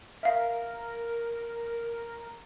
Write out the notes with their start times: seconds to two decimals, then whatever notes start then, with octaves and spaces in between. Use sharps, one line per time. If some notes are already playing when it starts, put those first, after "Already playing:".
0.23 A#4 E5 F5